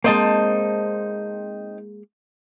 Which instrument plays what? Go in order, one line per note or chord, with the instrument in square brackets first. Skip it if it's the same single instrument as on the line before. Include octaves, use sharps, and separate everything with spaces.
[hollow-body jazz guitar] G#3 A#3 [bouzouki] C4 D#4 A5